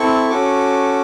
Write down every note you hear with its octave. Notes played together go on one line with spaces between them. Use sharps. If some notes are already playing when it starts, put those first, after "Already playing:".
Already playing: C4 E4 A4 C#6
C#4 F#4 A4 D6